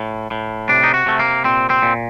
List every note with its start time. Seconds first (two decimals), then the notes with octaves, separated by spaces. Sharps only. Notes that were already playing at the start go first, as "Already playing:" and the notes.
Already playing: A2
0.31 A2
0.69 C3 D4
0.84 D#4
0.94 F#4
1.06 C3 A3
1.19 A#3
1.45 A#2 C4
1.70 C4
1.82 A#2